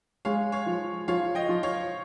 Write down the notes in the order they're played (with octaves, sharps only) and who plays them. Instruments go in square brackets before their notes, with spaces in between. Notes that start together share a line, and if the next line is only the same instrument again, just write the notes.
[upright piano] G#3 [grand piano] C#5 F5
[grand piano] C#5 F5
[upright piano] F3
[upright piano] F3 [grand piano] C#5 F5
[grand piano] D#5 G5
[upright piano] F3
[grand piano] C#5 F5